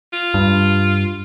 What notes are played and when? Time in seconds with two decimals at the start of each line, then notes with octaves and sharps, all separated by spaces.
0.13 F4
0.34 G2